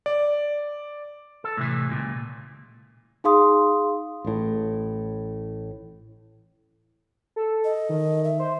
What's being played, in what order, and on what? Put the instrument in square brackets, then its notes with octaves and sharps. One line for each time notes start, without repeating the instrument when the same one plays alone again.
[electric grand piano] D5
[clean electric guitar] A4
A2 C3 E3
C#2 A#2
[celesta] D#4 G#4 F5 C6 D#6
[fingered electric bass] A1 A2
[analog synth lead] A4
[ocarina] D#5
[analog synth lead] D#3
[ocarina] E5
[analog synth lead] C5